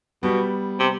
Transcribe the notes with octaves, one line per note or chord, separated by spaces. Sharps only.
B2 G3 B3
C3